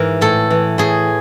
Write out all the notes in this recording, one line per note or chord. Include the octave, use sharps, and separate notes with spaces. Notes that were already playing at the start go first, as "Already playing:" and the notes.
Already playing: G#2 E3 A#4
A2 A4
E3
A2 G#4